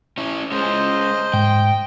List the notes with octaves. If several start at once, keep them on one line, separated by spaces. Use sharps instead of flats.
C#4 E4
G#3 C#4 C5 D#5
G#2 G5